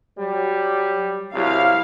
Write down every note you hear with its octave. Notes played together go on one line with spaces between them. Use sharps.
F#3 G3
C2 F#3 E4 G4 F5